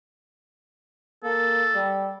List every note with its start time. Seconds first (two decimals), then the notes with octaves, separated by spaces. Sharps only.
1.24 A#3 A4
1.74 G3